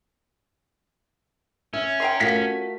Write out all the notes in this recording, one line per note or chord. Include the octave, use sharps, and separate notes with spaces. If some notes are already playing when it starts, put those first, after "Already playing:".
C#4 E5
G5 A#5 C6
A3 F4 F#4 A#4 B6